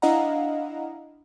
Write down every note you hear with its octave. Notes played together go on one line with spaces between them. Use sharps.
D4 E4 D#5 F5 F#5 A#5